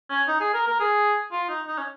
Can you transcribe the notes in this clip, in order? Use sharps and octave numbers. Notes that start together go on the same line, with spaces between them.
C#4
D#4
G#4
A#4
A#4
G#4
F4
D#4
D#4
C#4